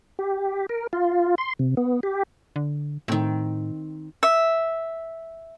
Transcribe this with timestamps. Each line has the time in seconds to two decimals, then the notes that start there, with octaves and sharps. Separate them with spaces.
0.19 G4
0.69 A#4
0.93 F4
1.38 C6
1.59 C3
1.77 B3
2.03 G4
2.56 D3
3.08 A2 D#3 C4
4.23 E5